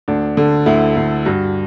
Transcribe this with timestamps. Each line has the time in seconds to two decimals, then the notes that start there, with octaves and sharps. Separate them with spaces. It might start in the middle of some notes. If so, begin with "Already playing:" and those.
0.08 D2 D4
0.37 D3
0.66 D2 E4
0.96 D2
1.25 G2 F#4